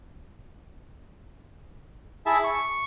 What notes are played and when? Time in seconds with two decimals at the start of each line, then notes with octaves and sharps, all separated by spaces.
2.26 E4 G#4 E5 A5
2.44 C#6